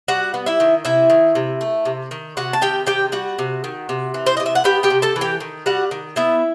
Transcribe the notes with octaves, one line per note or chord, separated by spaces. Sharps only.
G3 F#4 F#5
B3
E4 E5
D#3
C3 E4 E5
D#3
C3
A3
C3
D#3
C3 F#4 F#5
A5
D#3 G4 G5
C3 G4 G5
G3 F#4 F#5
C3
D#3
C3
E3
C5
C3 D#5
E5
F#5
B3 G4 G5
G4 G5
C3
A4 A5
E3
G4 G5
D#3
G3 F#4 F#5
D#3
B3 E4 E5